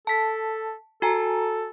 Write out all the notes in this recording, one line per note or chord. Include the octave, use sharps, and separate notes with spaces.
A4 A5 B6
F#4 A4 G#5 A#5